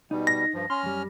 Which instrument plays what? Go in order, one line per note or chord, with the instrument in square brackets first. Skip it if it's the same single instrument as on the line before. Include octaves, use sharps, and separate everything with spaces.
[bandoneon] B2 G3 [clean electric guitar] D#4
[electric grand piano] A#6
[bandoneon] G2 F3
[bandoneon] C#4 F6 [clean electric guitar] C6
[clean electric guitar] F#2 G3